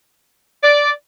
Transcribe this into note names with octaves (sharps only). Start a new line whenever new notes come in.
D5